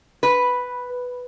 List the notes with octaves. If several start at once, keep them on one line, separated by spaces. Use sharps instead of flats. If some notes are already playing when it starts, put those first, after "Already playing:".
B4